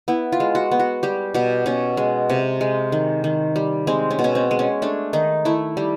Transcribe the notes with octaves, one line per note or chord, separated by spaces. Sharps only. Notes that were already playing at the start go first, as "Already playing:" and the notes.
B3 E4
F4
G#3
F#4
B3
F#4
G3 G4
B2 G4
B2 C#4
G#3
C3
G#3
D#3
D#3
G3
G#3 C4
C#4
B2
C#4
C4
G#3
C#4
A3 D4
D#3 D#4
A3 E4
G3